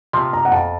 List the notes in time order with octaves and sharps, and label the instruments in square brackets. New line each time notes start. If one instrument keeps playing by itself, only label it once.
[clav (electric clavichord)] C3 F3 [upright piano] C6
[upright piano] A#5
F#5
[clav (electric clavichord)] F2 [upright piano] A5